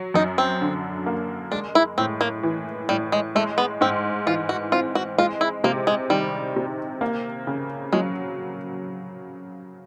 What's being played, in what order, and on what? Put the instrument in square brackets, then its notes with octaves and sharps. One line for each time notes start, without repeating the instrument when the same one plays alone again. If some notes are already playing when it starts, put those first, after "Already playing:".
Already playing: [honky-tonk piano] F#3
[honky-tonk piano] F#2 [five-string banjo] D#4
[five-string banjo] C4
[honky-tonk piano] D3
A#3
[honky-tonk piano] G#3 [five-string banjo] D4
[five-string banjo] E4
[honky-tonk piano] A2 [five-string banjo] C4
[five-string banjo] A#3
[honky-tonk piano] E3
[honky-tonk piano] A2 [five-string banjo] G3
[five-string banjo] G#3
[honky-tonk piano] G#3 [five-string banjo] A3
[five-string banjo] B3
[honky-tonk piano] G#2 [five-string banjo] C4
[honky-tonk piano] E3 [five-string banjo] F4
[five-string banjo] F#4
[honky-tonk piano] C4 [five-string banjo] F4
[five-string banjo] F#4
[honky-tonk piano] G#3 [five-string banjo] F4
[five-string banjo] E4
[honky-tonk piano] C3 [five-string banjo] A#3
[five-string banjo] G#3
[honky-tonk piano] D#3 [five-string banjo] G3
[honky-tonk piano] C3
A#3
C#3
[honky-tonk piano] F#3 [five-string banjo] G#3